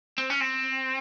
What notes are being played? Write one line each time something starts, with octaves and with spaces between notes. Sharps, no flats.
C4
C#4
C4